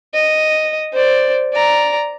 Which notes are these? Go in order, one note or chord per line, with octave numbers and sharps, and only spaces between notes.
D#5
C5 D5
D5 A#5